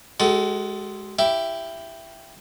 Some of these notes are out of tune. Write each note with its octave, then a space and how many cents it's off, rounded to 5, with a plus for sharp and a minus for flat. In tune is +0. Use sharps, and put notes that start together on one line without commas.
G#3 +5 F#4 +45 A4 +0
E4 +15 G4 +0 E5 +15